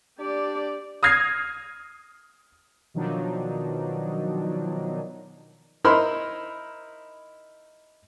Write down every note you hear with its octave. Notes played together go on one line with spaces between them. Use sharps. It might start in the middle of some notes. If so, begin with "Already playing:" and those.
D4 G4 D5
D#6 F6 G#6 A#6 C7
B2 D#3 F3 F#3 D4 D#4
D#4 E4 A#4 C5 B5 C6